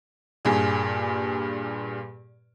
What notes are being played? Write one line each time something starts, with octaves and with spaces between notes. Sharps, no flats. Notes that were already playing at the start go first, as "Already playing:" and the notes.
G2 A#2 G#4